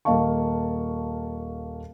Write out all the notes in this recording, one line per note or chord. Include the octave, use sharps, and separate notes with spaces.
D#1 A#3 D#5 F5 A5 C#6